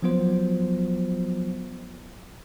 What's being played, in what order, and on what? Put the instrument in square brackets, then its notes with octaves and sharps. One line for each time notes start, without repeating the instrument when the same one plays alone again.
[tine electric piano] F3 F#3 B3 F4 C5